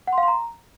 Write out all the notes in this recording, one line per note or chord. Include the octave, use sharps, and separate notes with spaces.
F#5
C6
F5
C6
A#5